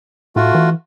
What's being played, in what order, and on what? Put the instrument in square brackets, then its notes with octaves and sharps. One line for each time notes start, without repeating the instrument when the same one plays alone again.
[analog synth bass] A2 [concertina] A3 F4 F#4
[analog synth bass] E3